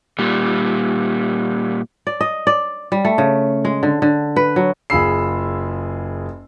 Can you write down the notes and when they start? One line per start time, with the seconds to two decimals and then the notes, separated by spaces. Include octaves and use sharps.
0.19 A#2 G3
2.07 D5
2.21 D#5
2.47 D5
2.92 G3
3.05 A3
3.18 C#3
3.65 G#3
3.83 D3
4.02 D3
4.36 B4
4.56 F#3
4.90 F#1 F4 G#4 B5 E6 C7